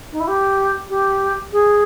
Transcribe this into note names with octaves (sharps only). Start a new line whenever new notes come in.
D#4
E4
G4
G4
G#4